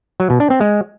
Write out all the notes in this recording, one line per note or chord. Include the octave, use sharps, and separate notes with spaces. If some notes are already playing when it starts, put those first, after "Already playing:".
F#3
B2
D4
C4
G#3